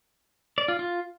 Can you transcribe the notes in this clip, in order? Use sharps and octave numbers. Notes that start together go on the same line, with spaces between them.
D5
F4
F4